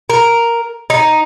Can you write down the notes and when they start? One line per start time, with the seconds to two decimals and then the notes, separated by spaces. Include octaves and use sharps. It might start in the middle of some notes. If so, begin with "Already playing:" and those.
0.10 A#4
0.90 D#4